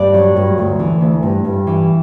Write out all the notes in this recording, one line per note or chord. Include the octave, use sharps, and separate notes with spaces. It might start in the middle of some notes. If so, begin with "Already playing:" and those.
Already playing: G2 D5
F#3
G2
D2
E3
D2
G2
G2
E3